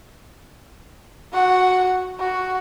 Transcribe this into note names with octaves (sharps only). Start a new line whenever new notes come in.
F#4 F#5
F#4